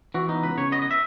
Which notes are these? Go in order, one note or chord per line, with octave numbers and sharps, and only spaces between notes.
E3 F#4
B3 D#4
C#2 B4
C#3 C#5
B3 D#5
D#5
E5